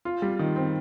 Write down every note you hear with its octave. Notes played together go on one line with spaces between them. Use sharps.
F4
G3
D#3
C4